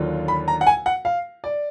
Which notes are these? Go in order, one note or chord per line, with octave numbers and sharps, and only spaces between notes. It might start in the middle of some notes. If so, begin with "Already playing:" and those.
Already playing: D#2 D3 F#3 D4 F4
B5
A#5
F#5
G#5
F#5
F5
D5